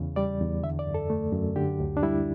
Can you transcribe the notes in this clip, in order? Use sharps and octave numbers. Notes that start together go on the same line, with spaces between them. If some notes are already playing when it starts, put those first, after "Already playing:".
Already playing: E2 C#3
G3 D5
E2
D3 E5
D5
F#2
A4
A3
F#2
D3 G4
D2
D4
G3 E4